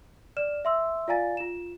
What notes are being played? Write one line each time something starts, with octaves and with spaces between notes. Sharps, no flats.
D5 F6 E7
E5 C6 E6
F4 D5 F5 G#5 A#5 A6
F4 E7